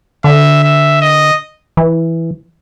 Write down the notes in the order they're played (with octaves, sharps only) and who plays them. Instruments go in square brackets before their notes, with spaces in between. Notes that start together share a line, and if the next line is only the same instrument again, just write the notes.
[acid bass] D3 [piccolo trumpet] E5
[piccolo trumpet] E5
D#5
[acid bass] E3